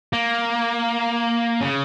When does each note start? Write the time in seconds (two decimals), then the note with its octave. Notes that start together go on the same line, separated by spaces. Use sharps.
0.13 A#3
1.61 C#3